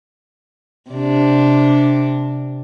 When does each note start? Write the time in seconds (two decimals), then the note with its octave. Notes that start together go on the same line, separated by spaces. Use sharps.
0.90 C3 D4